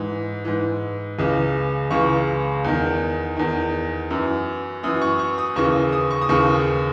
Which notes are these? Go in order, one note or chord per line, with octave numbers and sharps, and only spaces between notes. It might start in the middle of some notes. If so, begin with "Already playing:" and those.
Already playing: G#2 E3
G#2 E3
C#2 C#3 E3
C#2 C#3 E3 C#6
E2 D#3
E2 D#3
F#2 E3
F#2 E3 D#6
C#6
C#6
D#6
D#2 C#3 E3 C#6
D#6
C#6
D#6
D#2 C#3 E3 C#6